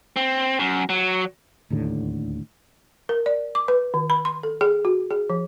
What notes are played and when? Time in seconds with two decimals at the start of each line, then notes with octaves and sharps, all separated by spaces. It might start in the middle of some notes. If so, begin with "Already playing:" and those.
0.16 C4
0.59 F#2
0.89 F#3
1.70 D1 D#2 A2 D3
3.09 A#4
3.26 D5
3.55 D6
3.68 B4
3.94 D#3
4.10 B5
4.25 C6
4.43 A4
4.61 G#4
4.85 F#4
5.11 G#4
5.30 F3